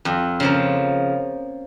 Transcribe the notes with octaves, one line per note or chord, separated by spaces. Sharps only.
F2
C#3 F3 A#3